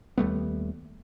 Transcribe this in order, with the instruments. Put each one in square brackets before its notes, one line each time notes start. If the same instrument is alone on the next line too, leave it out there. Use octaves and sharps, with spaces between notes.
[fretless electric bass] D#2 G3 A3 B3